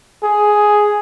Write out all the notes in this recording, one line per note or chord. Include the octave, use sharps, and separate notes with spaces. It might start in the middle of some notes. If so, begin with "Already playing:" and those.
G#4